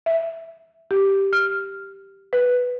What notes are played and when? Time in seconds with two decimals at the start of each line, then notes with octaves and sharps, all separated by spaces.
0.06 E5
0.91 G4
1.33 F6
2.33 B4